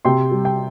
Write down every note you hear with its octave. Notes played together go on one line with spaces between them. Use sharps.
C3 G5 C6
G3
G5